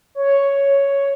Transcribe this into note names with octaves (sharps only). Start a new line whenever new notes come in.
C#5